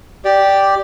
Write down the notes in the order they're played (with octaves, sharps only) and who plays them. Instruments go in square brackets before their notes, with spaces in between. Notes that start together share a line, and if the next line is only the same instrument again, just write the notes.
[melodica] G4 D5